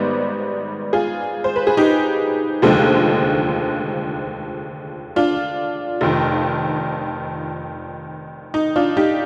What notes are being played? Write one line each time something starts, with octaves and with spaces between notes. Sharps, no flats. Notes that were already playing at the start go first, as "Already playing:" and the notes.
Already playing: G#1 G#2 G3 B3 B4 C5 D5
F4 G#4
C5
B4
G#4
D#4 G4
F1 D#2 D3 F3 G#3
D4 F4
F1 F2 D#3
D#4
D4 F4
D#4 G4